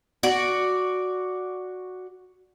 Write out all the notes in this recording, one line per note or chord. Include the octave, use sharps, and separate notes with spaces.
F#4 D5